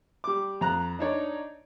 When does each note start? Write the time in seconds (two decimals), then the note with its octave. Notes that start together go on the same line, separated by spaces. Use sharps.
0.24 G3 D6
0.61 F2 A#5 F#6
0.99 D4 D#4 C#5 D5